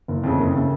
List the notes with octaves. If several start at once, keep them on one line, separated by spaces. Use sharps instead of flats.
F#1
F2 C#3
F#1
C#3